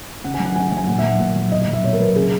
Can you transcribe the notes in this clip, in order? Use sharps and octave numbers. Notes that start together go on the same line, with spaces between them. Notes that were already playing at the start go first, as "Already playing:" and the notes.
C#3 F#5
G#5
F#3
F#5
C#3 G#5
F#3 F#5
G#5
A#2 F#5
F#3 E5
F#5
A#2 F#5
F#3
B2 D#5
D#5
F#3
E5
B2 C#5
A#4
F#3 B4
C#3 G#4